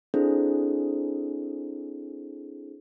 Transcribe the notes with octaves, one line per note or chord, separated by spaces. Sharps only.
C4 D4 E4 G#4 A4 C5